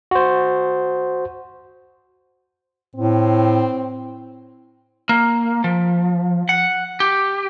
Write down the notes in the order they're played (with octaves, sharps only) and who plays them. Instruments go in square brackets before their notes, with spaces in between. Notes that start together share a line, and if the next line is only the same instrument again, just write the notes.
[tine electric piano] F#4 C5
[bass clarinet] A2 [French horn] C4
[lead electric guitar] A#3
F3
F#5
G4